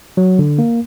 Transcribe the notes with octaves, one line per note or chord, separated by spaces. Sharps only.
F#3
D3
A#3